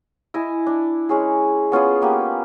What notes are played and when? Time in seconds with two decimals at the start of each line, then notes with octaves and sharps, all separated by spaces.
0.34 E4 D#5 E5 G#5
0.67 D4
1.09 G#3 C#4 G#4
1.72 B3 C#4 F4 G#4
2.02 A#3 B3 G4